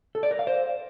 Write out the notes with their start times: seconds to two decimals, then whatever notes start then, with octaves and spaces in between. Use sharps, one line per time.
0.15 A4
0.23 D5
0.31 A#4
0.39 F5
0.47 C5